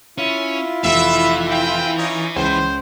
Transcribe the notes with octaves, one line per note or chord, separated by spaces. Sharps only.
C#4 E4 F4
F1 E3 E5 B5
C4 C5 G5
C#4 D#4
C#2 C#3 C5